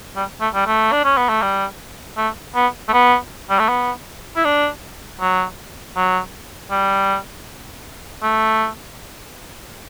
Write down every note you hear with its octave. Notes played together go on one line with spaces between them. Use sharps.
G3
A3
G3
A3
D4
C#4
B3
A3
G3
A3
B3
A3
B3
G3
A3
B3
E4
D4
F#3
F#3
G3
A3